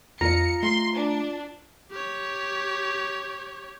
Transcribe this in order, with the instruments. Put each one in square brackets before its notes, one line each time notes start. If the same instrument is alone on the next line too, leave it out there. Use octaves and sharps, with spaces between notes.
[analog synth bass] F2 [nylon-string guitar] F4 D#5 [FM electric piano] A#5 [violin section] C#7
[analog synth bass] A3 [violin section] C6
[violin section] D4
[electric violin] G4 C#5